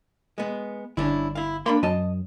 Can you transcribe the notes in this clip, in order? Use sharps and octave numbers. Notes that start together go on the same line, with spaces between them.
G#3 B3
G1 C#4 D4 E4
E4 F5
A#3 D4 B5 C6
F#2 D#5 A5